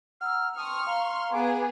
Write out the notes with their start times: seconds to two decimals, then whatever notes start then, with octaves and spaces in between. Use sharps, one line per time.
0.21 F#5 A#5 E6 F6
0.57 G5 A5 C6 C#6 D#6 F6
0.87 F5 A#5 C6
1.33 B3 G#4 D6